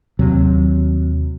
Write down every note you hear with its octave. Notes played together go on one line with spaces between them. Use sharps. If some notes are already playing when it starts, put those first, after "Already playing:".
D#2 C3 F#3